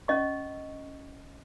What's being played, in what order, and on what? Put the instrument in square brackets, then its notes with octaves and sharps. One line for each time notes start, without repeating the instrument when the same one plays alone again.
[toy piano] C#4 D#5 C#6